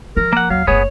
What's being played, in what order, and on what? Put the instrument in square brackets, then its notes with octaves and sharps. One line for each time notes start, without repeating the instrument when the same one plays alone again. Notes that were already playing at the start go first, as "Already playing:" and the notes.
[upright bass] F3 [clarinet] A#4
[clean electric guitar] A#3 F#5
[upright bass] D#2 [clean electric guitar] F#3 [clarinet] F5
[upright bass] F#1 A3 [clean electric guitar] B3 G#4 [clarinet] C#5